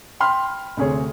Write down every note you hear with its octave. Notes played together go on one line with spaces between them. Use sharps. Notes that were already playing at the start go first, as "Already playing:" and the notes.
G5 B5 C6 F6
D2 C3 G#4 C#5